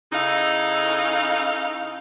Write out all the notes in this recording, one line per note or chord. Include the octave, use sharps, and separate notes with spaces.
C#3 D#4 E4 A4 D#5 F5